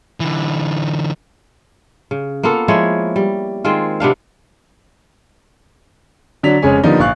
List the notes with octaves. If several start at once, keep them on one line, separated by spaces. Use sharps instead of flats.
D3 E3
C#3
A#3 B3 F4 A4
F3 G#3 E4 C#5
G3
D#3 G#3 C4 F4
C3 B3 D4 F5
D3 F#3 D4 B6 F7
F1 C#3 G#3 G#4 C#5 G#5
D3 F3 G3 A#3 B3 D#4
A#1 F5 C#6 F#6